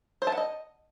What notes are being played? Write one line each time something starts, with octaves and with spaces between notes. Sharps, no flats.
C5
A5
F#5
D#5